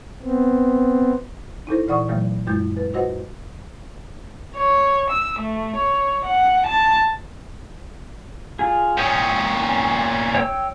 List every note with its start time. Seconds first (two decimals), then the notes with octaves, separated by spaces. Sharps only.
0.22 B3 C4
1.67 D#4 E4 A4 C5
1.87 A#2 E3 D5 F#5 C#6 D#6
2.08 A#2 D3 E3 F#3 A3
2.47 F#2 G#3 F4 G6
2.77 B4
2.94 F4 F#4 B4 C5 D#5 F#5
4.55 C#5
5.10 E6
5.39 A3
5.76 C#5
6.25 F#5
6.66 A5
8.59 F4 G#4
8.97 A#2 C#4 G5 D#6
10.35 C#5 G5 E6